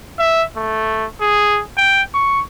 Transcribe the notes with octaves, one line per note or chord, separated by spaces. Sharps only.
E5
A3
G#4
G5
C#6